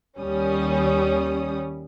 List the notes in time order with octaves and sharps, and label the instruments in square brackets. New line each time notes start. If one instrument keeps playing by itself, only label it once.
[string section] D#2 G3 C#4 D#6